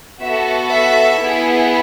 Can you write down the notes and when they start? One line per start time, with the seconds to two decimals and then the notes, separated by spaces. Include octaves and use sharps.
0.23 B3 F#4 A4 E5
0.71 E5
1.19 B3 E4 G#4